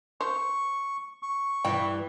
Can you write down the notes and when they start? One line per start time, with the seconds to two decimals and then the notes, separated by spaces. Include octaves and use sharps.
0.21 C5 C#6
1.22 C#6
1.65 G2 E3 G5